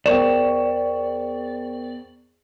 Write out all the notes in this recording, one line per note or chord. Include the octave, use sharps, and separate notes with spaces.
E2 A#4 C5 D5 G5 C#6 E7